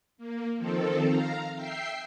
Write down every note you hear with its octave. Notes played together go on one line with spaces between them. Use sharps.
A#3
D#3 F3 C4 A4
F5 A#5
E5 G5 C7